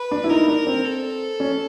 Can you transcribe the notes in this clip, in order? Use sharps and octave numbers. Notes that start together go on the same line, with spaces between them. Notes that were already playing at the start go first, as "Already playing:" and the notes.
Already playing: B4
D4
E4
D#4 A#4
D4
C4
A4
C#4